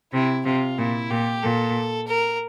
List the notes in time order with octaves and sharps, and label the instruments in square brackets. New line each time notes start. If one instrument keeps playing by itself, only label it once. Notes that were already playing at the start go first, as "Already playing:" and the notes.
[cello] C3 [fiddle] E4
[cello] C3 [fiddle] F4
[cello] A#2 [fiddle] E4
[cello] A#2 [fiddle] G4
[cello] A#2 [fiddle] A4
[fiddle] A#4